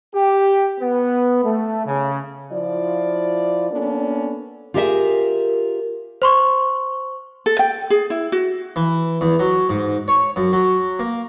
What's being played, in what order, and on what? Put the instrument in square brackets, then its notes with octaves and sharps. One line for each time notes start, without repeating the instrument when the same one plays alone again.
[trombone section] G4
B3
A3
C#3
[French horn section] F3 E4 F4 D5
A#3 B3 C#4 D4 A4
[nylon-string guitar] F4 G4 G#4 A#4 D5 E5
[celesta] C5 C6 C#6
[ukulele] A4
G5
G#4
E4
F#4
[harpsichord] E3
E2
F#3
G#2
C#5
F#2
F#3
A#3